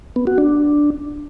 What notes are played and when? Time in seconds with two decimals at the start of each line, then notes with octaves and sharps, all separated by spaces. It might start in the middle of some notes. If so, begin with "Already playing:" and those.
0.16 B3
0.27 F#4
0.38 D4